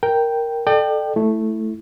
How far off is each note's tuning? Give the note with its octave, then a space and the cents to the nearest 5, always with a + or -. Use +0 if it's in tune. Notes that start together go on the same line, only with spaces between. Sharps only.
A#4 +0 G5 +0
A4 +0 D5 +40 G5 +0
A3 +0 E4 +0